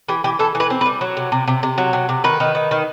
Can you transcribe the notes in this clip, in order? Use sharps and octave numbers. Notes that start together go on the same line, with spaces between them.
E3 G4
E3 G4
E3 A4
E3
B4
C4
B4
G3
F#3
C3
C3
C3
C3
F#3
C3
C3
D#3 B4
D#3
D#3
D#3